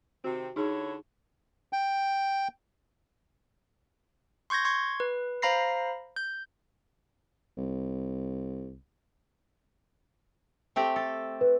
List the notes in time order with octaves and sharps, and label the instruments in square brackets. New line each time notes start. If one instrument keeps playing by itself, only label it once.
[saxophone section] C3 D#3 C4 [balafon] F#4
[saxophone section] D3 E4 C#5 [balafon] D#4 G#4
[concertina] G5
[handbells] C6 C#6 G6 G#6 A#6
C6 C#6 G#6
B4
C5 F5 A#5 B5 A#6 C7
G6
[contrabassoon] C2
[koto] A3 C4 G4
A4
[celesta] B4